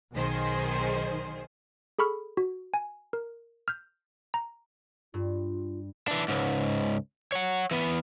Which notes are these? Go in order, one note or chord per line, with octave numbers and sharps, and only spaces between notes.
B1 D#3 G#4 C5
G#4 A4 B5 C#6 F6
F#4
G#5
A#4
F6 G6
A#5
G2 F4
E3 D4
C#2 G#2
C#5 F#5
E3 B3